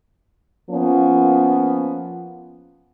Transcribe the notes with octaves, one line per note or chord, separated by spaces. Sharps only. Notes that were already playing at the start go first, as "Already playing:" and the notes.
F3 A#3 B3 C#4